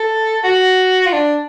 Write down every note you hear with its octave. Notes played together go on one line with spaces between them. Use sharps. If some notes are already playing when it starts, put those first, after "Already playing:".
Already playing: A4
F#4
F4
D4